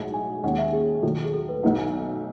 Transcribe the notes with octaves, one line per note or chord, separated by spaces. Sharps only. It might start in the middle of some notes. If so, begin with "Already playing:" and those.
Already playing: B1 A2 G#3 D#4 F#4
G#5
D#2 D#3 G#3 C#4 F#5
E5
G#4
D#3 F#3 A3 A4
G#4
A4
B4
B1 B2 A3 D#4 F#5
G#5
G#5